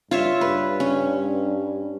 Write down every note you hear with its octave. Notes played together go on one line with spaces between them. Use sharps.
G2 F4 C#5 E5
G2 B4
C#4